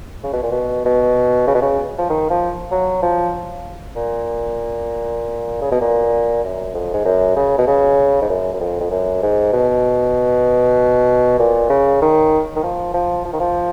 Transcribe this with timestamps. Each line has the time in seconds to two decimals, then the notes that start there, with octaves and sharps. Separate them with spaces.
0.24 C#3
0.33 B2
0.43 A#2
0.51 B2
0.85 B2
1.47 C#3
1.55 B2
1.62 C#3
1.98 F3
2.09 D#3
2.30 F3
2.71 F#3
3.02 F3
3.96 A#2
5.62 C#3
5.71 B2
5.81 A#2
6.44 F#2
6.74 F2
6.93 G#2
7.05 F#2
7.36 C#3
7.58 B2
7.67 C#3
8.21 G#2
8.29 F#2
8.53 F#2
8.60 F2
8.80 F2
8.91 F#2
9.22 G#2
9.53 B2
11.39 A#2
11.70 C#3
12.01 D#3
12.56 D#3
12.63 F3
12.94 F3
13.25 F3
13.33 D#3
13.40 F3